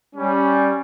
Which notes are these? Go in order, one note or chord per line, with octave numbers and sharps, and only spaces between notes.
G3 C#4